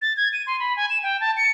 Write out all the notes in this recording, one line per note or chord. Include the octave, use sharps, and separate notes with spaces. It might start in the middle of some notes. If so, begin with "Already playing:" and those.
A6
G#6
D#7
C6
B5
G#5
E7
G5
A5
C#7